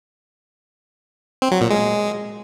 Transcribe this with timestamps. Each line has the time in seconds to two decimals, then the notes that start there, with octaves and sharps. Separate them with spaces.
1.42 C4
1.51 F#3
1.61 A#2
1.70 G#3